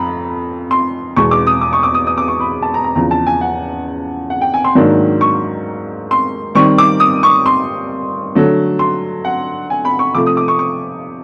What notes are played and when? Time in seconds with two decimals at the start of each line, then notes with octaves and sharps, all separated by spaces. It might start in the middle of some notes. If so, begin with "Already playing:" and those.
Already playing: F2 A#5 B5
0.71 C6
1.16 E2 B2 G#3 C#6
1.31 D6
1.47 D#6
1.61 D6
1.73 C#6
1.83 D6
1.94 D#6
2.07 D#6
2.18 D6
2.28 C#6
2.40 B5
2.62 A5
2.74 A#5
2.84 A#5
2.96 E2 C#3 F3 A#5
3.11 A5
3.27 G#5
3.41 F#5
4.30 F#5
4.41 G5
4.54 G#5
4.64 C6
4.75 G#2 D#3 F#3 A#3 D4
5.21 C#6
6.11 C6
6.55 D#3 G3 C4 C#6
6.78 D6
7.00 D#6
7.23 C#6
7.46 C6
8.35 D3 F#3 A3
8.79 C6
9.25 F#5
9.70 G#5
9.85 B5
9.99 C#6
10.15 C3 F3 A3 D6
10.26 D#6
10.37 D6
10.48 C#6
10.59 C#6